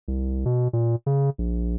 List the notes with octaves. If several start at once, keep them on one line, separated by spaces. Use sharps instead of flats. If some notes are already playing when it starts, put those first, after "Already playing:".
C2
B2
A#2
C#3
A#1